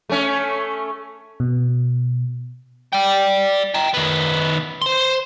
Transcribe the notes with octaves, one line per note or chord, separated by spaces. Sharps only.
A3 C#4
B2
D5 G5
G5 A#5
D#3 B3
C5 C6